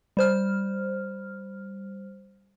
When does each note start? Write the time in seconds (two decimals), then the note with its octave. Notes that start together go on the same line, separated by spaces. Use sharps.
0.17 G3 C5 F6